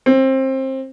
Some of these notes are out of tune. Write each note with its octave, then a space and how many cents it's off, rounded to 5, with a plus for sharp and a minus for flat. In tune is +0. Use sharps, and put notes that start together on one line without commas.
C4 +25